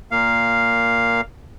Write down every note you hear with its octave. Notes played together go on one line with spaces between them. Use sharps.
A#2 A#3 F5